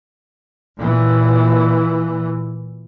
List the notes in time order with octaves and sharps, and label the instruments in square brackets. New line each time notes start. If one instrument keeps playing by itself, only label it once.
[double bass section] A#2 E3